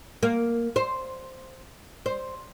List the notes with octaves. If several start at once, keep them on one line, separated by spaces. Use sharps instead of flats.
A#3
C5
C5